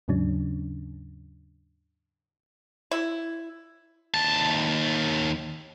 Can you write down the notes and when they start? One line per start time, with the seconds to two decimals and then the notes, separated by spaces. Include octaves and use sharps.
0.08 D#2 G#2 C#3 F#3 C#4 D4
2.91 E4
4.14 D#2 A5